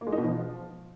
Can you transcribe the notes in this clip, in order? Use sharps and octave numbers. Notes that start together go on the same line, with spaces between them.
A#3
G#3
D#4
B2
F3